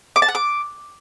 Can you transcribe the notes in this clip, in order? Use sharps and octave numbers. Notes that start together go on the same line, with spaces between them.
D6
A5
F#5
D6